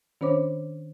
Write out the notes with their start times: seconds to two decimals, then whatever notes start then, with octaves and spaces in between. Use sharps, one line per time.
0.21 D#3 C#4 D4 C5 C#5 D6